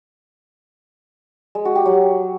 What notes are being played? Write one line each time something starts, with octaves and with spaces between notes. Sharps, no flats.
G#3
F#4
G4
F#3